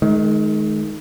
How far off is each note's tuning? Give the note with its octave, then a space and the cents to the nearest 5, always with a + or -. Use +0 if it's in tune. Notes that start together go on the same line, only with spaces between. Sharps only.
D#3 +0 G#3 +35